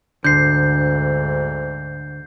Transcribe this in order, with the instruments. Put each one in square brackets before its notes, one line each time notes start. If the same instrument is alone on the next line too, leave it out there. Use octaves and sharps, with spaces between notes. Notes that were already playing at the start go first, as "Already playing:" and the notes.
[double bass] D2 G#2 [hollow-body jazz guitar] D3 [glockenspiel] G6 C7